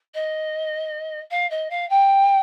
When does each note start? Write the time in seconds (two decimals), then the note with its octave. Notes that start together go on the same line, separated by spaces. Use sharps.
0.15 D#5
1.31 F5
1.51 D#5
1.70 F5
1.90 G5